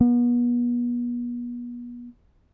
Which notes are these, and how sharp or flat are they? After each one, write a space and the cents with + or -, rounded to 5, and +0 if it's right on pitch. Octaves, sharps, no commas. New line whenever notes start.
B3 -35